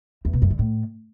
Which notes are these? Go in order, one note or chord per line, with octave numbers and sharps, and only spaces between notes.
E2
B2
F#2
D3
A2